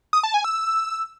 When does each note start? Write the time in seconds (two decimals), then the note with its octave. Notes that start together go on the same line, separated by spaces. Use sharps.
0.13 D#6
0.23 A5
0.34 G#5
0.44 E6